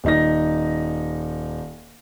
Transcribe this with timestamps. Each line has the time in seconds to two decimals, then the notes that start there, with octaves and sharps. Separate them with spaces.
0.04 D#1 D#4 A#6